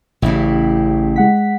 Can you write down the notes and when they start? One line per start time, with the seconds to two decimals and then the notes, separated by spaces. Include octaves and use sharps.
0.22 A1 A2 C#3 E4 G4
1.16 G#3 F#5 B6